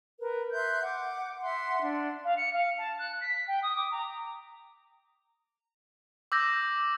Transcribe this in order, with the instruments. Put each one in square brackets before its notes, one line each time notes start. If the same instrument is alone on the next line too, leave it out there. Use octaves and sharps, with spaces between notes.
[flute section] A#4 B4
E5 C6 F#6 G6
F#5 D6
E5 F#5 C6
D4
[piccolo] F5
C#7
F5
A5
F#6
B6
G5
D#6
D6
A#5
[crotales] D6 E6 G6 A#6